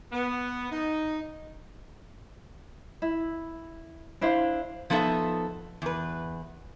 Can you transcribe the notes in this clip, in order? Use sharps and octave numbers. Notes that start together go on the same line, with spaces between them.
B3
D#4
E4
D4 E4 C5 F5
F3 B3 D#4 A4 E5
E2 B4